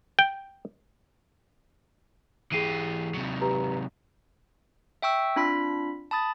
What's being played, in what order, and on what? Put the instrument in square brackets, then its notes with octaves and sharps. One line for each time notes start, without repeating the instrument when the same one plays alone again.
[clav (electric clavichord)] G5
[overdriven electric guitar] E3 G4 [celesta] G#4 C7 D#7
[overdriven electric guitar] C3 F#3
[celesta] G4 B4 A#5
[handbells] E5 G5 C#6 E6
C4 D4 F4 B5 B6
A5 B5 D#6 A6